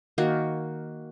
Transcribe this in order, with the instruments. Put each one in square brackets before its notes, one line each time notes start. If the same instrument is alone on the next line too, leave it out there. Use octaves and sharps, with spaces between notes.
[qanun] D#3 A#3 F#4